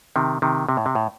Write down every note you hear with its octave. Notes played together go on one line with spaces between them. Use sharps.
C3 D#3
C3 D#3
C3
A2
C3
A2